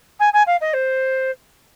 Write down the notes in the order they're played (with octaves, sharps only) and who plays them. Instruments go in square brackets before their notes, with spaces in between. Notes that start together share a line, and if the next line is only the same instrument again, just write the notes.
[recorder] G#5
G#5
F5
D#5
C5